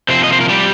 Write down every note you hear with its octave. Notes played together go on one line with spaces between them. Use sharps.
C3 F3 A#3 C4 C5
D#5
C5
A#4
G3 G4